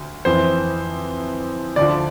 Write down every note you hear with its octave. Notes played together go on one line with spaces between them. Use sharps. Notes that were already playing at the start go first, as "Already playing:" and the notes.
Already playing: D2
F2 E3 C5
D2 D3 F3 D5